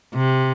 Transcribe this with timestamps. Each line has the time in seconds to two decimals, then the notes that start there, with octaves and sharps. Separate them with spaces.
0.15 C3